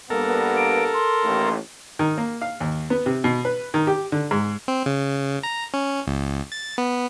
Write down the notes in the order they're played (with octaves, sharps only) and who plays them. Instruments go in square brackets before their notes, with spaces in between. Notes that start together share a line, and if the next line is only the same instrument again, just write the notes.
[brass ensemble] G2 A#3 B3 [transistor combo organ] A4 A#4
[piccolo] D7
C6
[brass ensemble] A1 D#2 A2
[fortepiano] D#3
A#3
F5
D#2
B3
C3
B2
B4
D#3
G4
D3
G#2
[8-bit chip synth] C4
C#3
A#5
C#4
C#2
A6
B3